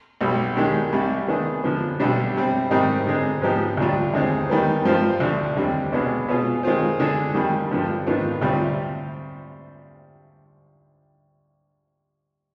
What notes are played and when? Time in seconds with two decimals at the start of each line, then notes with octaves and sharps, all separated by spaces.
0.21 B1 B2 G3
0.56 D#3 G#3 D4 G4
0.93 C2 C3 G3
1.28 D#3 B3 D4 G#4
1.63 D3 F3 B3
2.00 B1 B2 G3 D4
2.35 C3 G3 C4
2.71 G#2 D#3 G3 C4 D#4
3.07 D3 G#3 C4
3.42 G#2 F3 B3 D#4 G4
3.77 D2 D3 G3 D4 F4
4.14 D#2 D3 G#3 C4 D#4
4.50 D#3 G3 B3
4.85 G2 F3 C4 F4 C5
5.20 D2 D3 F3
5.56 D#2 D3 G3 C4
5.92 C2 B2 G#3 B3 D4
6.28 B2 B3 F4 G#4
6.63 D#3 G#3 C4 F4 C5
7.00 D3 G#3 D4
7.34 F2 D#3 G3
7.71 G2 D3 F3
8.07 G#2 D#3 B3 D4 F4
8.42 D2 C3 G3 C4 F4